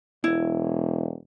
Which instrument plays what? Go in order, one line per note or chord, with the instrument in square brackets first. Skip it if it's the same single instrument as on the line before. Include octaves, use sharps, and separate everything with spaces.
[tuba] E1 [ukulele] E4